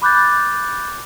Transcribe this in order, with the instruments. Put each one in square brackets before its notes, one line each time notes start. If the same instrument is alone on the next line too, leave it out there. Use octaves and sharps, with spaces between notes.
[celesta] B5 D6 F#6 G6 A6